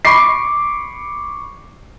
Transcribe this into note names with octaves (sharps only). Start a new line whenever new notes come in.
B5 C#6 D6 C7